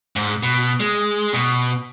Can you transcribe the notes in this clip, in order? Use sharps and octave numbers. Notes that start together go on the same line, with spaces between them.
G#2
B2
G#3
B2